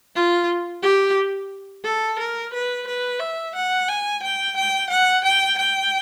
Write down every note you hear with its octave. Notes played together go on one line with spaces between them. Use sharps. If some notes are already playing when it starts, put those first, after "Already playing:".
F4
G4
A4
A#4
B4
B4
E5
F#5
G#5
G5
G5
F#5
G5
G5